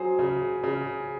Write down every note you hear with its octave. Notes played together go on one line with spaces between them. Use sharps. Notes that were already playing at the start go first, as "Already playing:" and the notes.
Already playing: F#3 G#4 C5
C#3
C#3